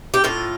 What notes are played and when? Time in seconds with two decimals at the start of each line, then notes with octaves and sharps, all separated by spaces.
0.14 G4
0.24 A2 F4